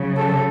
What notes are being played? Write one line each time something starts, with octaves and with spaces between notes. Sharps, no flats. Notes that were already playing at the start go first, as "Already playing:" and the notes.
Already playing: C#3 F#3
A4